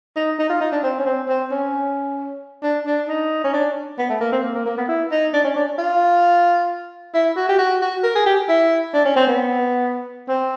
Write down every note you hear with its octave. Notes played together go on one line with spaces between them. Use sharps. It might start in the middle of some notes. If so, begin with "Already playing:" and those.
D#4
D#4
F4
D#4
D4
C4
C#4
C4
C4
C#4
D4
D4
D#4
C#4
D4
B3
A3
A#3
C4
A#3
A#3
A#3
B3
E4
D#4
D4
C#4
D4
F4
E4
F#4
G4
F#4
F#4
A#4
G#4
G4
E4
D4
C#4
C4
B3
C4